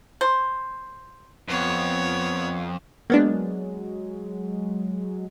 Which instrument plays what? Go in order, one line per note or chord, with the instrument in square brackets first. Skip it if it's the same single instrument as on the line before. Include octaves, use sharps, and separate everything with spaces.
[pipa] C5
[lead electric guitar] F2 [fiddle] B3 C#5
[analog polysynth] F#3 G#3 [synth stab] A#3 B3 D4